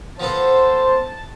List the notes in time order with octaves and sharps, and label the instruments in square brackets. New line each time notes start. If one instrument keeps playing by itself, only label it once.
[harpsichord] F3 B3 A4 [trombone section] C5 [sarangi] A5